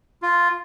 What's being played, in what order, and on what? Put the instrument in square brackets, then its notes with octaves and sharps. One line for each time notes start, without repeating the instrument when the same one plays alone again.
[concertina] F4